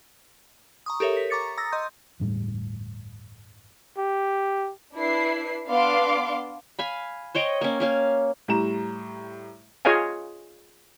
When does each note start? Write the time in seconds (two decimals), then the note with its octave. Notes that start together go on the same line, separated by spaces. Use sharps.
0.86 A#5 C#6 D#6
1.00 G4 A4 A#4 C#5 E5
1.17 B6
1.30 A#5 C#6 D6 A6 C#7
1.58 A#5 D#6 E6 A6 A#6
1.72 D#5 C6 D#6 G6
2.20 G1 E2 A2 G3
3.98 G4
4.96 D4 E4 B4 C7
5.69 B3 D4 F5 C6 D6
6.79 F5 G#5 B5
7.35 C5 C#5 D#5 G5
7.61 A#3 C#4
7.80 A#3 C#4 F5
8.48 A2 G3 A#5 E7
9.85 F4 G#4 C#5 D#5 F5 G#5